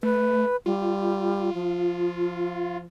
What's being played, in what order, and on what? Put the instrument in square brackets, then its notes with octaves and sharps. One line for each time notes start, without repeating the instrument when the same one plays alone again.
[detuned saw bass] A3 [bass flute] B4
[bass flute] G3 [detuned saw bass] F4
[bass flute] F3